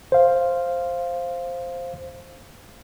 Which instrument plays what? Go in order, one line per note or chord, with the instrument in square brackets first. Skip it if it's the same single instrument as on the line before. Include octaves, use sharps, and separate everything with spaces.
[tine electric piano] C5 F5